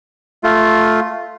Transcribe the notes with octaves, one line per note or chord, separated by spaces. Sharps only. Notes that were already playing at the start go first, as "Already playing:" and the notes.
A3 F4